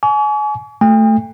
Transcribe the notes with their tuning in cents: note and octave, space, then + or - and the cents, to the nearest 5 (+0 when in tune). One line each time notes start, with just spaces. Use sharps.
G#5 +30 C#6 +45
A3 +0 G5 +40